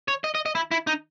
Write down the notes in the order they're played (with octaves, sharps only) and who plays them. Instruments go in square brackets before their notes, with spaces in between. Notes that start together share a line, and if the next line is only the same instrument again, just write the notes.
[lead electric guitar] C#5
D#5
D#5
D#5
E4
E4
D#4